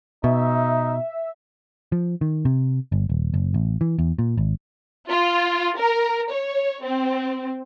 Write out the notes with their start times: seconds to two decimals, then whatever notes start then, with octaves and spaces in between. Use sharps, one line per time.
0.24 B2 D#4 E5
1.92 F3
2.21 D#3
2.45 C3
2.92 G1
3.09 D#1
3.34 F#1
3.54 A1
3.81 E3
3.99 E2
4.19 A#2
4.37 G#1
5.09 F4
5.78 A#4
6.31 C#5
6.83 C4